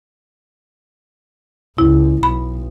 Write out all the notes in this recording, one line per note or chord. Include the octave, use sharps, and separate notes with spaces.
C#2 E4
B1 B5